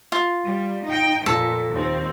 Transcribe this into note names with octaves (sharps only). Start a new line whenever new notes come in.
F4
G3
D#4 G5
F2 A#2 A4
D#2 C4